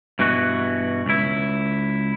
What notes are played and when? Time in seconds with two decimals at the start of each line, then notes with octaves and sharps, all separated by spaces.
0.19 G2 B2 E3 F#4
1.06 C#2 E4